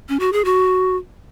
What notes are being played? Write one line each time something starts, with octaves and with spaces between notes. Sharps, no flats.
C#4
F#4
G#4
F#4